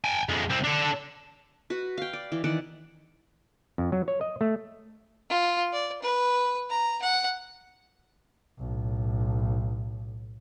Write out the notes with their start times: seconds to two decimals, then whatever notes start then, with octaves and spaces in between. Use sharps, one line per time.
0.04 G5 G#5
0.29 F2 G#3
0.50 C2 C4
0.64 D4 A4
1.70 F#4 B4
1.97 F5 G5
2.13 D5
2.32 E3
2.44 D#3 E3 D5 F#5
3.78 F2
3.92 F#3
4.08 C#5
4.21 D#5
4.41 A3
5.30 F4
5.73 D5
6.02 B4
6.69 A#5
7.02 F#5
8.58 B1 A2